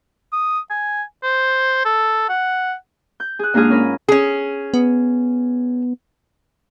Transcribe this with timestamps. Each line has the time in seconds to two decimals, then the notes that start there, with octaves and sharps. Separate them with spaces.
0.33 D#6
0.70 G#5
1.23 C5
1.85 A4
2.29 F#5
3.20 G6
3.39 G#4 F#6
3.54 G#2 A#3 D4 F4 G#4 F6
3.70 C#4 A#4 B5
4.08 C#4 G#4
4.74 B3